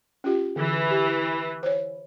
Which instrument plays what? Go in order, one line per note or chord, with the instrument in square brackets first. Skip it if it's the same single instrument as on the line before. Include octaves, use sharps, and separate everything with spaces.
[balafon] C#4 F4 G4
[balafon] D3 [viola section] E3
[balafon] G4
C5 C#5